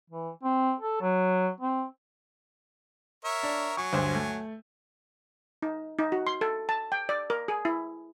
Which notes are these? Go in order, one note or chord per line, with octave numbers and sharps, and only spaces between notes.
E3
C4
A4
F#3
C4
A#4 C#5 E5
D4
F#3 G#5 C#6
D2 G2 C5
A3
D#4
D#4
F#4
C6
A4
A5
G5
D5
A#4
G#4
E4